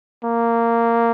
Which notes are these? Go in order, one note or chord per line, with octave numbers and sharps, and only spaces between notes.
A#3